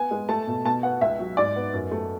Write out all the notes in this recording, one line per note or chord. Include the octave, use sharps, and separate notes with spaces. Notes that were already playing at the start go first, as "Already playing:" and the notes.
Already playing: B3 G#5
G#3
A3 A5
B2
B2 A5
B3 F#5
C#2 E5
F#3
G#2 D5
B3
F#2
A3